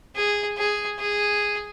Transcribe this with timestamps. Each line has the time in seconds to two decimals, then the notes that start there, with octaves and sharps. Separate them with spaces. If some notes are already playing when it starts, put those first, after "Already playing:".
0.16 G#4
0.57 G#4
0.99 G#4